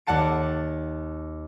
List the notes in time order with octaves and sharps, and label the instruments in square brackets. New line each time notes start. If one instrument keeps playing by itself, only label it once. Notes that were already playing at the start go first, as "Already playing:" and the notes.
[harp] D#2 D5 F#5 A5 D7